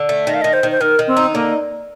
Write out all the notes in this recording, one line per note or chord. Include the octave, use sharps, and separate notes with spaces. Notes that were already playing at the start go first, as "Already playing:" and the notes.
Already playing: D3
A3
D#3 D#5
F5
D#3 D#5
C5
D#3
C5
D#3 A#4
D#3
C4
D#4
D3 A#3